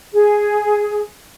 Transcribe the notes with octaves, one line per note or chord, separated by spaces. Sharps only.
G#4